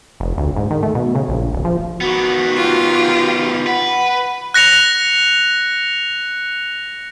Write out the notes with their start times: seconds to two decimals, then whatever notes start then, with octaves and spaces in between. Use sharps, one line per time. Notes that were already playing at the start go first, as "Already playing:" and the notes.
0.20 F1
0.38 D2
0.56 G#2
0.71 D#3
0.83 A3
0.95 B2
1.15 C#3
1.28 A#1
1.53 D1
1.65 F3
2.01 D#3 B3 F#4
2.55 F4 G4
3.67 B4 F#5
4.54 F#6 A#6 C#7 F7